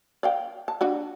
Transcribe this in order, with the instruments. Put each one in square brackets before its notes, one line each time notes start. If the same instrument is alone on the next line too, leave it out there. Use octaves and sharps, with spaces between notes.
[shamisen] D5 F5 G5
A5
D4 F#4 G4